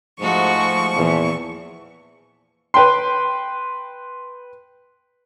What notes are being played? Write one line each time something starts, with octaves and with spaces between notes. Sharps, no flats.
G#2 F3 G#3 A3 F#4 C#6
E2 A#2 E3
B4 G5 C6